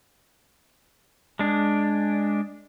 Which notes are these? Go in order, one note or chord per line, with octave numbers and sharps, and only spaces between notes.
G#3 D4